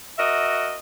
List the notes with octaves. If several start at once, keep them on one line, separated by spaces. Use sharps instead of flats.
F#4 A#4 D#5 E5